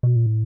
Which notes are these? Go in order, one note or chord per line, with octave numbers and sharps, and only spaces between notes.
B2
A#2
A2